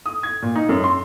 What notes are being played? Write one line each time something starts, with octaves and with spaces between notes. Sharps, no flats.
D#6
G#6
A#2
D#4
F#2
C6